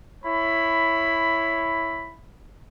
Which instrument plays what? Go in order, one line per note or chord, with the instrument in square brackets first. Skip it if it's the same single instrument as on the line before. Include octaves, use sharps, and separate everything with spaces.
[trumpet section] E4 C#5 B5